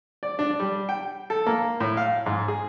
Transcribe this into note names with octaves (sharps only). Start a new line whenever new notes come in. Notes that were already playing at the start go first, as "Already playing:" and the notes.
D5
D4
G3
G5
A4
A#3
A2
F5
G#2
G#4